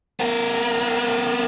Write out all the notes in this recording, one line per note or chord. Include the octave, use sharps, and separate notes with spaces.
B3 A#4